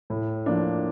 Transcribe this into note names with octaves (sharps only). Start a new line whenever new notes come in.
A2
F3 A#3 D4